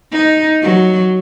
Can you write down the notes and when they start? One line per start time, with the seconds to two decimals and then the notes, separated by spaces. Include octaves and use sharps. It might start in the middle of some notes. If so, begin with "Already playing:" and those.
0.12 D#4
0.62 F#3